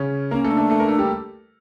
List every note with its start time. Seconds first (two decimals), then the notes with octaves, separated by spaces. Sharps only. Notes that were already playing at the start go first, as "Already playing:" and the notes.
Already playing: C#3 C#4
0.31 A#3 C#4 A#4
0.44 A3 A4
0.51 D4
0.57 A3 A4
0.70 A3 A4
0.80 A#3 A#4
0.89 A3 A4
0.99 G3 G4